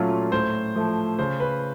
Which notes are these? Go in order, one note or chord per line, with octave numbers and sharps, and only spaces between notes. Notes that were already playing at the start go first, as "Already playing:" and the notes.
Already playing: A#2 F#3 A3 C#4 F4
A2 C5
F3 A3
C#3 C5
B4